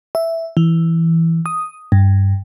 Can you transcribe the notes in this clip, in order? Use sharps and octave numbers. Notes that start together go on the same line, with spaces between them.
E5
E3
D#6
G2